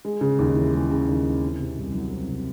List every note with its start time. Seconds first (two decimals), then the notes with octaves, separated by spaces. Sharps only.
0.05 G#3
0.21 C#3
0.38 D#2
0.56 E3
0.73 G#3
0.91 C#3
1.08 D#2
1.26 E3
1.43 C4
1.60 C3
1.77 C2
1.94 F#3
2.11 C4
2.28 C3